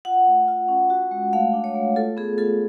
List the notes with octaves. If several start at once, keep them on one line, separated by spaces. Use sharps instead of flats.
F4 F#5
A3
F4
C#4
F#4
G#3
A3 F5
D4
C#5
A3
F4 A4
B3 G#4
F4 A4